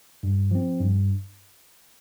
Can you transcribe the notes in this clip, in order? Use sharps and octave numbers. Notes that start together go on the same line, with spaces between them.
G2
F3 C4
G2